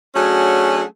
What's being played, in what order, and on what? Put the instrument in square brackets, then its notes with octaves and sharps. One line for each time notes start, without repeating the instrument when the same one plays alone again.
[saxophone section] F#3 A3 C#4 D4 F#4 G#4